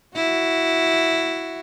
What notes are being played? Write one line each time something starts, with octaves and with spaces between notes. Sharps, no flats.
E4 F#4